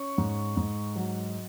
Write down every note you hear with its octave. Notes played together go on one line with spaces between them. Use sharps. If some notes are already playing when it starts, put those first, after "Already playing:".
Already playing: C#4 C#6
G#2
G#2
F#3